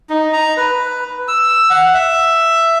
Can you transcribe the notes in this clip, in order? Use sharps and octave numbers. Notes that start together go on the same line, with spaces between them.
D#4
A#5
B4
E6
F#5
E5